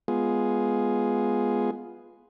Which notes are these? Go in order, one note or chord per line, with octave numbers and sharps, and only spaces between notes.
G#3 B3 F4 G#4